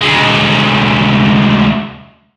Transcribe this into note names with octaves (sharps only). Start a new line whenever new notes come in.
D2 G#3